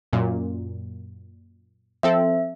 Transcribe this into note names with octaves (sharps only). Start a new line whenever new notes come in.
F#2 A#2
F3 C4 A4 E5